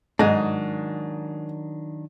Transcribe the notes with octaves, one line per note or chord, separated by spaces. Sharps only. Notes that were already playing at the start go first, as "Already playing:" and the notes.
G#2 D#3 F#3 D4 D#5